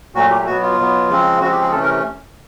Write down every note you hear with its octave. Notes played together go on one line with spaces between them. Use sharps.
A#2 F#3 A3 F#4
G4
B2 F#3 B3 F#4
F4
B2 F#3 B3
C#3 F3 G#3 C4
C#3 F3 G#3 C4 F#4
G4
G#4
C3 E3 A3 C#4 A4
A#4